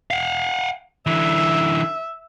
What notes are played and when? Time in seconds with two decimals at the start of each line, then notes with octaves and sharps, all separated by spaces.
0.11 F5 F#5
1.07 D3 E3 E5